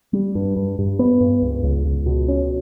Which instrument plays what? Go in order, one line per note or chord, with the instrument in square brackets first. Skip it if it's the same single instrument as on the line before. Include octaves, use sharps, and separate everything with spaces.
[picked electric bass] G3
G2
G2
G2
B3
G2
C#2
C#2
C#2
B2
C#4